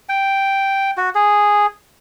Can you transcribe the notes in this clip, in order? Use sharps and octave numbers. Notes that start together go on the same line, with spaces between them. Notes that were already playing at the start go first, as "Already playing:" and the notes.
G5
F#4
G#4